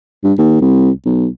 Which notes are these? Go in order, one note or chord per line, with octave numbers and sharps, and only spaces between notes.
G2
D#2
C2
B1